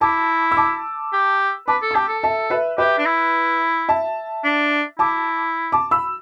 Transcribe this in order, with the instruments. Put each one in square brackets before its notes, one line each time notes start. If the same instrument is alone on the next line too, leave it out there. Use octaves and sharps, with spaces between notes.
[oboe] E4 [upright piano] A5 D6
[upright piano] E6
A5 D6
[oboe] G4
[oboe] B4 [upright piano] A5 D6
[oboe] A4
[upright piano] E6
[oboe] G4 [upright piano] A5 D6
[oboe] A4
[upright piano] E5 A5
B4 E5
[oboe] G4 [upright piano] B4 E5
[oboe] D4
E4
[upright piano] E5 A5
[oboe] D4
[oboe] E4 [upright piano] A5 D6
[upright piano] A5 D6
B5 E6